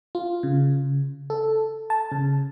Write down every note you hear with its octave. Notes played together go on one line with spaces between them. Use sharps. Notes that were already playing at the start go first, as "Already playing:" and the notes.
F4
C#3
A4
A5
C#3